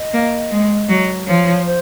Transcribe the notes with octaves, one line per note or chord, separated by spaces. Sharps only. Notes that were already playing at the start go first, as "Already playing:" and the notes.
Already playing: D#5
A#3
G#3
F#3
F3 C#5
C5